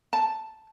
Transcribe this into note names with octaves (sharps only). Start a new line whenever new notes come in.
A5